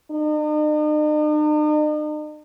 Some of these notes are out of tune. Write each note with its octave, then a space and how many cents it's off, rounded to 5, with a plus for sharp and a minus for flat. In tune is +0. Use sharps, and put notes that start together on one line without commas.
D#4 -45